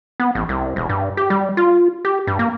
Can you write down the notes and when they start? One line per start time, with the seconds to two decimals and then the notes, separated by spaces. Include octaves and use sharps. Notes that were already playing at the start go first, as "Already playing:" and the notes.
0.20 B3
0.35 A1
0.49 C2
0.76 E1
0.89 G2
1.17 G4
1.30 G3
1.57 F4
2.05 G4
2.27 G2
2.39 A#3